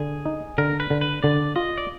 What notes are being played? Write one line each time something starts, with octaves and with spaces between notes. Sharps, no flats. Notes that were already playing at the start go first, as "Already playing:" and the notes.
Already playing: D3 G#4
D#4
D3 A#4
B4
D3
B4
D3 D5
F4 D#5
D5